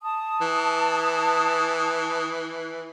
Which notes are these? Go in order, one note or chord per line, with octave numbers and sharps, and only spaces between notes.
A5 D#6
E3